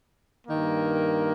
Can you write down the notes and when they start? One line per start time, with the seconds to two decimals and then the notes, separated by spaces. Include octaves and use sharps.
0.47 G2 D#3 A#3